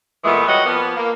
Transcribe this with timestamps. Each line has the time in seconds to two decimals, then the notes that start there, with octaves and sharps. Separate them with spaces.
0.24 A#2 E3 G#3 A3 B3
0.47 G3 F#4 C#5 D#5 F#5
0.66 F3 A#3 B3
0.96 A#3